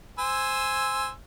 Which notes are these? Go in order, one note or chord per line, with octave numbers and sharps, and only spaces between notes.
C5 G#5 E6